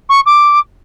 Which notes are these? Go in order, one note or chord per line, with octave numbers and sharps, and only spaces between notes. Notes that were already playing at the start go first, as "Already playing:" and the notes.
C#6
D6